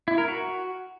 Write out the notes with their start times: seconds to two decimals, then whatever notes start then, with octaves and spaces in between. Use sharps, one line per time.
0.08 E4
0.18 A#4
0.28 F#4